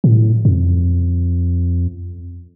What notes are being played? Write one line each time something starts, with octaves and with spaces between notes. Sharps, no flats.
A2
F2